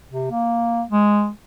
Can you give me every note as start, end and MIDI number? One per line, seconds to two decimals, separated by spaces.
0.11 0.30 48
0.31 0.82 58
0.91 1.30 56